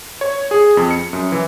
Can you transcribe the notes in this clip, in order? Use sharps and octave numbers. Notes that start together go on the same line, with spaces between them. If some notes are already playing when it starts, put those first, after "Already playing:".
C#5
G#4
F2
C#7
F#2
E3